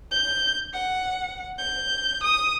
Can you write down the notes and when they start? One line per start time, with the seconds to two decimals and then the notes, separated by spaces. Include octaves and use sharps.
0.11 G6
0.73 F#5
1.58 G6
2.23 D#6